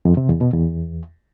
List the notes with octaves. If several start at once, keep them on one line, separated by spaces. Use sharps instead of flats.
F2
C3
E2
B2
E2